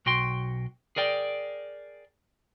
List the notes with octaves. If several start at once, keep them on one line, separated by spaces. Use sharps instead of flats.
B1 F#4 G5 C6
G#4 A#4 D5 G5